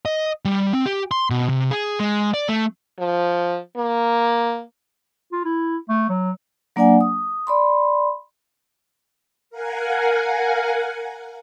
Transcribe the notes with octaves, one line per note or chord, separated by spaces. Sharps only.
D#5
G3
C4
G4
C6
B2
C3
G#4
G#3
D5
A3
F3
A#3
F4
E4
A3
F#3
F#3 A#3 D4 D5 F#5 G#5
D#6
D5 B5 C6
A#4 F5 F#5 G#5